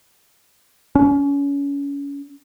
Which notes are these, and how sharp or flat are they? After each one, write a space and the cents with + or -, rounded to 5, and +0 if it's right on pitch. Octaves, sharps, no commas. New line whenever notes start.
C#4 +30